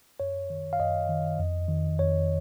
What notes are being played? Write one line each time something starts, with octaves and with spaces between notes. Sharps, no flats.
F#2 C#5
D#3
F5
F#2 D#5
D#3
F2
D#3
F2 C#5